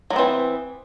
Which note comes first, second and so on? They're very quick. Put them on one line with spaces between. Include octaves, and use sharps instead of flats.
F#3 B3 C4 E3